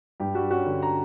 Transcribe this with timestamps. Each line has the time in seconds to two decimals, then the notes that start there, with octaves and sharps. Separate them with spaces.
0.20 G2 G4
0.34 G3 F#4
0.51 C#4 F#4
0.66 D3
0.82 A#5